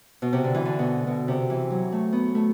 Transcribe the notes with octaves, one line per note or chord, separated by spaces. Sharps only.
B2
C3
D3
E3
D3
B2
B2
C3
E3
F#3
A3
B3
A3